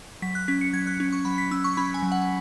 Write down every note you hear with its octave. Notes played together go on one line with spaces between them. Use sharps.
F#3 B6
F#6
C#4 B6
C#7
F#3 G#6
F#6
C#4
C#6
F#3 B5
B6
C#4 E6
C#6
C#4 B5
G#5
F#3
F#5